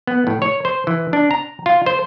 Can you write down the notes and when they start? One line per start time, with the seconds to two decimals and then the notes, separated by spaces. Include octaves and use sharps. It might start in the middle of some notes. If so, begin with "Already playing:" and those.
0.07 B3
0.27 A2
0.42 C#5
0.65 C5
0.87 E3
1.13 D4
1.31 A#5
1.66 F4
1.86 C5